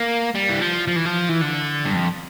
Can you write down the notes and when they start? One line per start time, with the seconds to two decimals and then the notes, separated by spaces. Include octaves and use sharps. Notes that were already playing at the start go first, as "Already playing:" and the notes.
Already playing: A#3
0.35 G3
0.49 E3
0.61 F3
0.88 F3
0.96 E3
1.05 F3
1.29 E3
1.41 D3
1.85 G2
1.94 F2